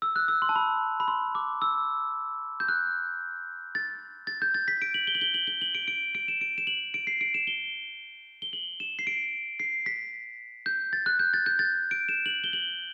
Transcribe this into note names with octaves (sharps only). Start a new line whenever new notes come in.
E6
F#6
E6
C6
A5
B5
B5
C6
D6
E6
G6
F#6
A6
A6
G6
A6
B6
D7
F#7
G7
F#7
G7
F#7
G7
F#7
D7
D7
D7
E7
D7
E7
F#7
D7
C7
D7
E7
G7
G7
F#7
E7
C7
D7
C7
B6
G6
A6
F#6
G6
A6
G6
A6
D7
E7
F#7
G7
F#7